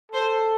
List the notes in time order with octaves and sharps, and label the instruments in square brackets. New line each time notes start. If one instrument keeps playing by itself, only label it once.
[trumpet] A4 [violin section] C5